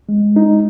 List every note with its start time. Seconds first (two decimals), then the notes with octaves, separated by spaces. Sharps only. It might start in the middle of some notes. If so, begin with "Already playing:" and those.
0.09 G#3
0.36 D#4